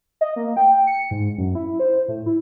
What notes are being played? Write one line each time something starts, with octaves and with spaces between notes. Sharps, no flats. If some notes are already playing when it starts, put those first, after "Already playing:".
D#5
A#3
G5
C#7
G#2
F#2
E4
C5
A2
E4